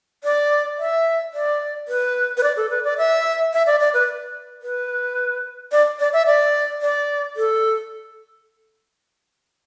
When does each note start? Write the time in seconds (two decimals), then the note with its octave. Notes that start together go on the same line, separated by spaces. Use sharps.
0.24 D5
0.79 E5
1.34 D5
1.88 B4
2.37 B4
2.43 D5
2.57 A4
2.70 B4
2.84 D5
2.98 E5
3.53 E5
3.66 D5
3.80 D5
3.94 B4
4.62 B4
5.72 D5
6.00 D5
6.13 E5
6.26 D5
6.82 D5
7.37 A4